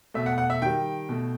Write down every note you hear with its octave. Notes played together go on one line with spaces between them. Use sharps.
B2 A3 E5
F#5
F#5
E5
D#3 G3 G5
B2 A3